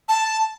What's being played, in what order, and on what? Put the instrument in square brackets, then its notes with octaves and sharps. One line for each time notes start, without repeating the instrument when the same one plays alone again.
[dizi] A5